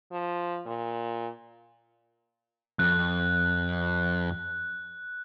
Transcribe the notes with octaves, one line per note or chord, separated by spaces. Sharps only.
F3
A#2
F2 F#6